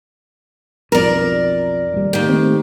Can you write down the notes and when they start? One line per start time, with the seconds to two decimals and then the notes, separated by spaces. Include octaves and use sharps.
0.92 B1 F2 A#4 D5
1.94 D#1 G3
2.13 D#3 A#3 G4
2.29 A3 C4